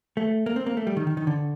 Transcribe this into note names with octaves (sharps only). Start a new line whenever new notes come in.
A3
A#3
C4
A#3
A3
G3
D#3
D#3
D#3
D3